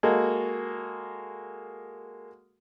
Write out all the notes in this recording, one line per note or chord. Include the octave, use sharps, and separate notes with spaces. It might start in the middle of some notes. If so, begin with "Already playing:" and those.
G#3 A#3 F#4 A4